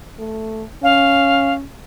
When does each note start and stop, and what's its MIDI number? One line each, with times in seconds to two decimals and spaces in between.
0.19 0.64 57
0.83 1.65 61
0.83 1.54 77